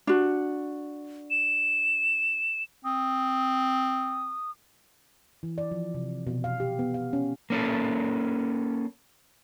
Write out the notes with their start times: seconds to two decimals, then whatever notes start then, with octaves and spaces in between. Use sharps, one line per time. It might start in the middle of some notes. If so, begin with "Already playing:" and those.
0.07 D4 F#4
1.31 E7
2.85 C4 D#6
5.43 E3
5.58 D5
5.71 F3
5.94 C3
6.27 B2
6.44 F5
6.60 G4
6.79 B3
6.94 F5
7.13 C#4
7.50 A#3 C#4 A4